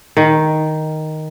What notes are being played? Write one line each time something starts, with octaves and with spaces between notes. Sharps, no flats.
D#3